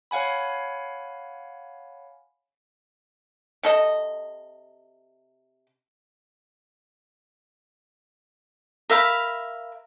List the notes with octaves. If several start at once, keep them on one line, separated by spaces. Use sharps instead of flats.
C#5 F5 F#5 G#5 B5
C3 A4 D#5
A#4 E5 F5 B5